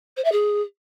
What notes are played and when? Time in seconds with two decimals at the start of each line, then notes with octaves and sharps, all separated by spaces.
0.17 C5
0.24 E5
0.32 G#4